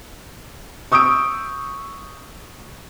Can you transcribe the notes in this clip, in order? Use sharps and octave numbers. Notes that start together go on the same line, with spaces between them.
C#6 D#6 E6 G6 D7